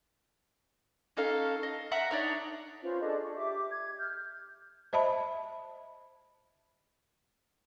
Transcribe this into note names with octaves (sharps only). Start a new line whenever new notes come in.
C#4 D#4 A4 F5
D#5
E5 F#5 A#5 E6
D4 D#4 C#5
C#4 F4 B4 C5
D4 G#4 A4 D#5
C#6
G4 E5 D6
G#6
F6 G6
C5 D#5 E5 A5 B5